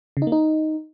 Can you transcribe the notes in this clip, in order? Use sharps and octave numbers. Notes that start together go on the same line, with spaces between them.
C#3
D#4
A#3
D#4